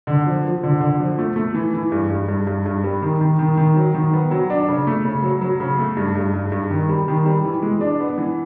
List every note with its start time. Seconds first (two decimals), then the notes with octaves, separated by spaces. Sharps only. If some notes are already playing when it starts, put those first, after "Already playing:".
0.07 D3
0.26 F3
0.45 F3
0.63 D3
0.81 D3
1.00 F3
1.19 A3
1.36 A3
1.54 E3
1.74 E3
1.92 G2
2.10 G2
2.28 G2
2.47 G2
2.66 G2
2.84 G3
3.02 D#3
3.21 D#3
3.39 D#3
3.57 D#3
3.77 F#3
3.95 D#3
4.13 B3
4.31 F#3
4.50 D4
4.68 C#3
4.87 A3
5.05 C#3
5.23 F#3
5.41 F#3
5.60 C#3
5.78 A3
5.97 G2
6.15 G2
6.34 G2
6.52 G2
6.70 D#3
6.89 G3
7.08 D#3
7.26 G3
7.44 E3
7.62 G#3
7.81 D4
8.00 B3
8.18 E3